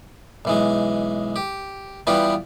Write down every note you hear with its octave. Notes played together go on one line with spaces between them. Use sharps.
B1 E3 G#3
G4
E3 G3 B3 F4 G4